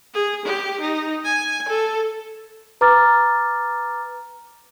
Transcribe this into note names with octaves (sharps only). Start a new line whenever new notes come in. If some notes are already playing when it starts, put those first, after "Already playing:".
G#4
G4
D#4
G#5
A4
B4 A#5 D6 F6 A6